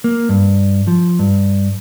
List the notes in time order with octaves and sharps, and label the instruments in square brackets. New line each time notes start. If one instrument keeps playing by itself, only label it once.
[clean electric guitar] A#3
G2
F3
G2